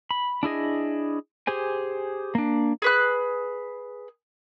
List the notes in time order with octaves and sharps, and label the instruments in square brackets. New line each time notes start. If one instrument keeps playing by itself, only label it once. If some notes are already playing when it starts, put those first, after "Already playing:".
[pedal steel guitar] B5
D4 E4 G#4 D#5
G4 G#4 C5 G#5
A#3 D4
[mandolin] G#4 B4 F#6